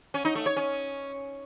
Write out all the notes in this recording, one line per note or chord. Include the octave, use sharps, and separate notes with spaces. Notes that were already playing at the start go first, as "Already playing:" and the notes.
C#4
D#4
A3
C#5
C#4